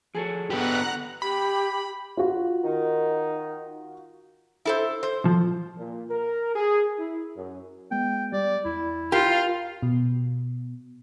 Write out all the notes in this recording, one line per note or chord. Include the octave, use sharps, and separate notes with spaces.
F3 F#4 G#4 A4
D3 B3 G4 B4 F#5 A#5 F#6 G6
G4 B5
F4 F#4
D#3 D#4
E4 A4 C5
C5
F3
A#2
A#4
G#4
E4
F#2
G#3 B3 G5
G3 D5
E2 E4
F4 G4 A#4 F5 C6
B2